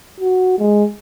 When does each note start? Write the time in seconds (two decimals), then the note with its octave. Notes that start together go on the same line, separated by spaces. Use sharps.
0.20 F#4
0.59 G#3